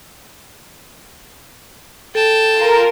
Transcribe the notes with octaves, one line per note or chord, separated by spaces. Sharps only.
A4 G5 A5
F4 A#4